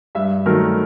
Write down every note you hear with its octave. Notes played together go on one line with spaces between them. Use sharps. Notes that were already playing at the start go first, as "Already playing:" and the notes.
G2 E5
D#3 F#3 A3 A#4